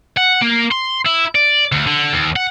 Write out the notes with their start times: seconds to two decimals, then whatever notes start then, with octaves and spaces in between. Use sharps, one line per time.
0.17 F#5
0.42 A#3
0.71 C6
1.06 E4
1.35 D5
1.72 D2
1.87 D3
2.13 D#2
2.36 F#5